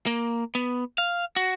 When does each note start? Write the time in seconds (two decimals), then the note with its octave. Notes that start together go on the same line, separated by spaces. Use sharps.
0.07 A#3
0.55 B3
0.98 F5
1.36 F#4